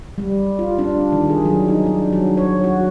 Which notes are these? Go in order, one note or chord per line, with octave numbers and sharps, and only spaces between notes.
G3
F4
D4
D#3
G#4
F#3
D#4
D4
F#3
C#5
F#4